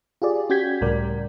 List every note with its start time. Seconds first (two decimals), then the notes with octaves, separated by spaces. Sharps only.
0.22 F4 G4 G#4 D5
0.50 C#4 F#4 G4 G6 G#6 B6
0.81 C#2 A2 G3 A#4 D5